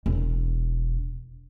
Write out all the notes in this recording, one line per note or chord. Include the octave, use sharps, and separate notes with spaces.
E1